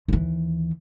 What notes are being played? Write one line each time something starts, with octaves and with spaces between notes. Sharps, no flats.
D#2 E3